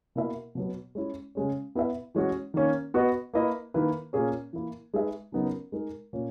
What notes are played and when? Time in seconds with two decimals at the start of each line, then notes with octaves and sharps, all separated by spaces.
0.15 B2 A#3 E4 A#4 E5
0.55 B2 F#3 B3
0.95 G#3 C#4 E4
1.35 C#3 G#3 C#4
1.75 B3 E4 B4 E5
2.15 E3 G#3 C#4 F#4 C#5
2.54 D#3 A#3 C#4
2.94 B3 F#4 B4 D#5
3.34 A#3 E4 B4 D#5
3.74 D#3 A#3 E4 B4
4.13 A#2 A#3 C#4 G#4 C#5
4.53 E3 A#3 E4
4.94 G#3 D#4 G#4 B4 E5
5.32 C#3 F#3 B3 D#4 A#4
5.72 G#3 D#4 A#4
6.13 A#2 A#3 C#4